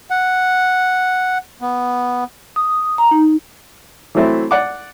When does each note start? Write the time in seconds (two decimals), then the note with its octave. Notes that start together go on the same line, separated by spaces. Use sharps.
0.10 F#5
1.61 B3
2.56 D#6
2.98 A#5
3.11 D#4
4.15 E3 F#3 A3 C4 E4
4.51 D5 F#5 D6